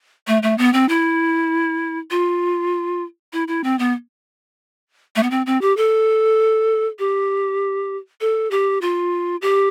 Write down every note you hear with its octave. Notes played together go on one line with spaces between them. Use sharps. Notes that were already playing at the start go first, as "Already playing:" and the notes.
A3
A3
B3
C4
E4
F4
E4
E4
C4
B3
A3
B3
C4
C4
G4
A4
G4
A4
G4
F4
G4